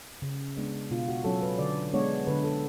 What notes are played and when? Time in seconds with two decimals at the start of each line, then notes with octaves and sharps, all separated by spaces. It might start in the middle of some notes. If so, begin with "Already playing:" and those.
0.22 C#3
0.57 G#3 B3 D4
0.91 B2 F4
1.08 F#4
1.24 F#3 C#4 A4
1.42 B4
1.59 D3 D5
1.93 G#3 B3 D4 C#5
2.27 D3 B4
2.44 A4